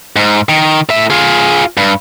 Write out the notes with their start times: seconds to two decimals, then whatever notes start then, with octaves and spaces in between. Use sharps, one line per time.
0.16 G#2
0.49 D#3
0.89 A2 E5
1.10 F4 G#4
1.77 G2